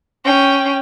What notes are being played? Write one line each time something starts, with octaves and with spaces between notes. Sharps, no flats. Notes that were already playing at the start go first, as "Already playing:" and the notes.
C#4 G5